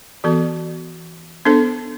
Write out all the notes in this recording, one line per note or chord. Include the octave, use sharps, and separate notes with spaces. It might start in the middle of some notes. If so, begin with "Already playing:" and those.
E3 B3 F#4 A4
B3 D4 A4 C5